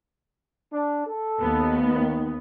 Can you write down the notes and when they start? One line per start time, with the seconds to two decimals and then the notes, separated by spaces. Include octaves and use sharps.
0.72 D4
1.07 A4
1.40 D#2 B3
1.97 D#3